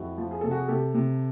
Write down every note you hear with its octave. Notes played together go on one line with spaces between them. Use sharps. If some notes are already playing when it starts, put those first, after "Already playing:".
Already playing: F2 E4 F#4
F3
G#4
C3 A4
F#4 G#4
C3 G4 A4
C3